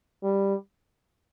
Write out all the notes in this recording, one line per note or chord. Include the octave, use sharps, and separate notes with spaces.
G3